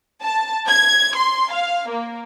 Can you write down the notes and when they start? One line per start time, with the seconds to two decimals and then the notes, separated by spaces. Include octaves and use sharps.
0.23 A5
0.68 G#6
1.16 C6
1.52 F5
1.89 A#3